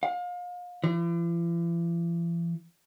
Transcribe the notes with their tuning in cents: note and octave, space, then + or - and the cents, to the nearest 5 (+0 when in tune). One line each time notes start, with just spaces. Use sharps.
F5 +35
E3 +45